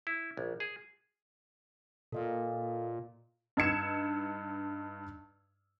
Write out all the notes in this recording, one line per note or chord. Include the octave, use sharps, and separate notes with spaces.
E4
A#1
G#4
A#2 A4 D#5 F5
G2 D#4 E6 G#6 C#7 E7